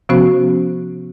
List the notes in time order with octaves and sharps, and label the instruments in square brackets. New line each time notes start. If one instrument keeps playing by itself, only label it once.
[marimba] C3 F3 B3 C#4 F#4 C5